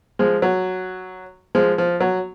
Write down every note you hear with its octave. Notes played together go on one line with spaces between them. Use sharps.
F3 G#3
F#3
F3 G#3
F3
F#3